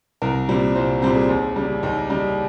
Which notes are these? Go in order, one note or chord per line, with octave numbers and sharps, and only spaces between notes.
C2 A#4
A#2 G3 C4
C2 C5
A#2 G3 C4 C5
G#4
D#2
C#3 G3
D#2 D#4
C#3 G3